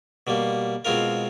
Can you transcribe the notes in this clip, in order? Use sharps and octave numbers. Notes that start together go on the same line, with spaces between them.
B2 G3 A#3
B2 G#3 C4 F4 A#4